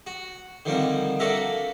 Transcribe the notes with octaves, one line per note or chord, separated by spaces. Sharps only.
F#4
D3 D#3 F3 G3 A#3 C4
A#3 D4 F#4 A4 A#4 E5